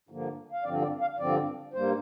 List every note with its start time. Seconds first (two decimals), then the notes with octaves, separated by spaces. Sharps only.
0.09 G2 D3 F3 A#3
0.52 F5
0.64 G2 D3 F3 C4 D5
0.82 D5
1.01 F5
1.19 G2 D3 F3 C4 D5
1.74 G2 G3 A#3 C5